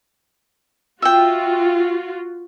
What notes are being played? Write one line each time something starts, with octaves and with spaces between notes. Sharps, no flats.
F4 F#4 E5 G5